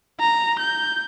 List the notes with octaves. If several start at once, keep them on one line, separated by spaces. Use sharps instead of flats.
A#5
G6